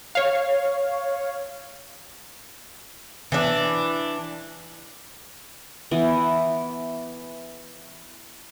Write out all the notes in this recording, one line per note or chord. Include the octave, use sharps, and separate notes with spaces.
C#5 F5
E3 D4
E3 B3